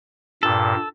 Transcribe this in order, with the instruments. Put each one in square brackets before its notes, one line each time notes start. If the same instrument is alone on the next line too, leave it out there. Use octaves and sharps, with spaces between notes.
[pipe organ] G2 A#2 [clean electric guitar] A4